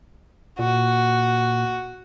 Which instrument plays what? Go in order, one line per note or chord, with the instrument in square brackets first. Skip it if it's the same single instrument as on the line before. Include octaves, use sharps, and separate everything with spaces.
[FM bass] A#2 [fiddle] F#4